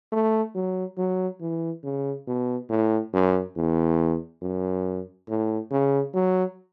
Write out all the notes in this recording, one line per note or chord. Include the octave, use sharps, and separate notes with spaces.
A3
F#3
F#3
E3
C#3
B2
A2
F#2
E2
F#2
A2
C#3
F#3